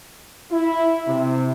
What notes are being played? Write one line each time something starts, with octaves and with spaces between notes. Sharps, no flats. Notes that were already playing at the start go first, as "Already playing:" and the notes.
E4
C3